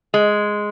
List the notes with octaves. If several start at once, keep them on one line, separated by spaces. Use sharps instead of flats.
G#3